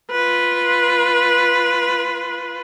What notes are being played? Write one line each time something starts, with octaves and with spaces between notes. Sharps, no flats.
F4 B4